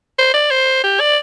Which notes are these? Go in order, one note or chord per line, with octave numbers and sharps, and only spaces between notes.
C5
D5
C5
G4
D5